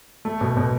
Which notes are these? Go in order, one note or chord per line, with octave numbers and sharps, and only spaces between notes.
A3
B2
B2